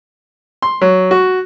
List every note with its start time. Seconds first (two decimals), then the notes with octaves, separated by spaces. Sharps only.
0.62 C6
0.81 F#3
1.11 F#4